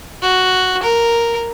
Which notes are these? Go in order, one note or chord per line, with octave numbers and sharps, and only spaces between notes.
F#4
A#4